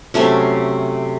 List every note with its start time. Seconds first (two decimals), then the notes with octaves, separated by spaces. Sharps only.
0.14 C3 F#3 A3 C#4